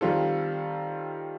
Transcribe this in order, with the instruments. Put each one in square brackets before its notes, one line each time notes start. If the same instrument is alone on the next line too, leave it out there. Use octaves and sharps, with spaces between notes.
[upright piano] D#3 G3 C4 F4 A4